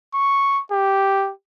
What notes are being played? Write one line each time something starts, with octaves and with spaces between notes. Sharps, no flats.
C#6
G4